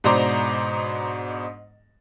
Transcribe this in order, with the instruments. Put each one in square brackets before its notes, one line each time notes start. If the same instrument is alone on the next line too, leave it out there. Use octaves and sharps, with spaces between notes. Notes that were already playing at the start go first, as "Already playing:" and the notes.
[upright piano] G#2 B2 D4 C5 A#5 D6